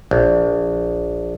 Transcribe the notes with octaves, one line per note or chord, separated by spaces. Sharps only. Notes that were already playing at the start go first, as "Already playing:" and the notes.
A#1